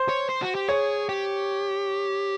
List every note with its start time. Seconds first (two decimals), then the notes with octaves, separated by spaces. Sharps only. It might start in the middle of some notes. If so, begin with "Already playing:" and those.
Already playing: C5
0.09 C#5
0.29 C5
0.42 F#4
0.55 G4
0.69 G#4 C#5
1.09 G4